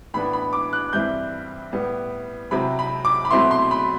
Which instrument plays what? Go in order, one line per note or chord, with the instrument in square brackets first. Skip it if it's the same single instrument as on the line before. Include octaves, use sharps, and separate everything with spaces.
[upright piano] A2 E3 B3 D4 B5
B5
D6
F#6
G2 E3 G3 C4 E4 G6
A2 G3 B3
C3 F#3 C4 E4 B5
B5
D6
B5
B2 F#3 A3 C4 E4 C6
C6
B5